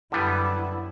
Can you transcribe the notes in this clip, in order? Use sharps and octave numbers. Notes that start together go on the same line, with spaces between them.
F#2 D3 G3 B3 E4